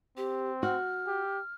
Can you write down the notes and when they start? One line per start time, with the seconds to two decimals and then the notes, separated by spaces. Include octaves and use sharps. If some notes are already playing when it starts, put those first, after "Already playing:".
0.17 C4 G4
0.63 F#4 F6
1.07 G4